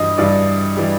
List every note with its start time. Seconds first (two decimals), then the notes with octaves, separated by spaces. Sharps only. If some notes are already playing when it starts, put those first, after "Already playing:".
Already playing: G2 E3 G3 D#5
0.18 G2 E3 G3 D5
0.77 E3 G3